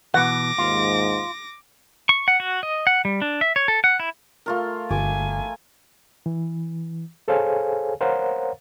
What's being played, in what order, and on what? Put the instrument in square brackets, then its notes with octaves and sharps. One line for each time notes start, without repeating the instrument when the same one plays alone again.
[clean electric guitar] B2 E3 [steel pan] F#5 [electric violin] D6 A#6
[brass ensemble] D#2 G#2 [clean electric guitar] F4
[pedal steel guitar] C#6
F#5
F#4
D#5
F#5
G3
D4
E5
C#5
A4
F#5
E4
[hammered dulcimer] A3 F4 A#4
[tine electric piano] G1 [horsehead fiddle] G#5 [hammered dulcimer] D6
[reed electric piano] E3
G#4 A4 C5 C#5 F5 G#5
A#4 C5 C#5 F5 F#5 A#5